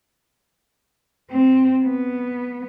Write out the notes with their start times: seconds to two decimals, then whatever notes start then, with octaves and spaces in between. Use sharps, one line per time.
1.31 C4
1.84 B3